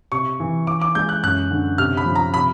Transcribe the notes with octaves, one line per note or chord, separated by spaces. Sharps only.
C3 C#6
E3
E3 D6
D6
G#3 G6
F#6
F#2 F#6
D3
C3 F6
B5
F3
A#5
C3 B5